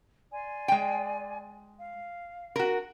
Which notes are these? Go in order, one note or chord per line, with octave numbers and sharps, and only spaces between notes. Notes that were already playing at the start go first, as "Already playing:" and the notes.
D5 G#5 C6
G#3 G5
F5
F#4 A#4